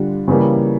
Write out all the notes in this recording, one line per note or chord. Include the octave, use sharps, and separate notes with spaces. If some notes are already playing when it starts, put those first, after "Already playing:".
Already playing: D3 G3 D4 F4
C#3 E3 G3 A#3